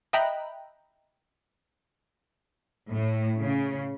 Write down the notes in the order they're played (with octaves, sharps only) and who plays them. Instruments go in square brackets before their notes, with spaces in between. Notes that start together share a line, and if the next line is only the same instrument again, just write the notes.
[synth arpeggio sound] D#5 E5 G5 A#5 B5 F#6
[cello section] A2
C#3